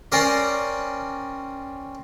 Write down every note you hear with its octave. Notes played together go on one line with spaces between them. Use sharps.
C4 C#4 A#4 D5